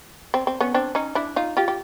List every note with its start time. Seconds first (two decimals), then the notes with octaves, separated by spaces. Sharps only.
0.34 C4
0.47 C4
0.61 B3 C#4
0.74 C4 D4
0.95 C#4 D#4
1.15 D4 E4
1.36 D#4 F4
1.57 F4 G4
1.68 G4